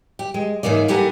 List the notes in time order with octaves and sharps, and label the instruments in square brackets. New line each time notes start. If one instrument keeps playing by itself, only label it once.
[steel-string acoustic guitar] G4
G#3
G#2 E3 A#3 C#4 D5
E4 G4 A4 A#4 F#5 G#5